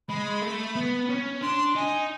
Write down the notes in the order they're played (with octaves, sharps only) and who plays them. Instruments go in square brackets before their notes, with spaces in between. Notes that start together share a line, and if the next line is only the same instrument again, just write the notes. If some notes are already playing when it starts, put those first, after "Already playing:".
[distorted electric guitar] G#3 [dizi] B5
[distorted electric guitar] A3
B3
C#4
[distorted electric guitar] D4 [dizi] C6
[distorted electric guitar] D#4 [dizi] G#5